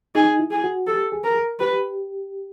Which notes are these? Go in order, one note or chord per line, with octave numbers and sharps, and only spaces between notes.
D#4 G#4
E4
G#4
F#4
G4 A4
G#4
A#4
G4 B4